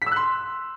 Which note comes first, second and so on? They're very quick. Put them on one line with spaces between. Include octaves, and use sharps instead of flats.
B6 E6 F#6 C6